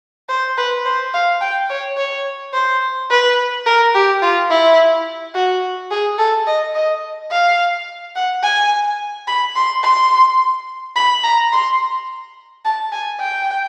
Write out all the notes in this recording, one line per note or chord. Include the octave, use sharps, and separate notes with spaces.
C5
B4
C5
F5
G5
C#5
C#5
C5
B4
A#4
G4
F4
E4
F#4
G#4
A4
D#5
D#5
F5
F#5
G#5
B5
C6
C6
B5
A#5
C6
A5
G#5
G5